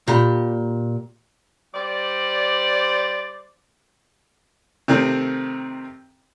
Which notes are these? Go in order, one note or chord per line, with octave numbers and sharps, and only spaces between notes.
A#2 G4 B5
G3 C5 D5
C3 D#3 A3 C4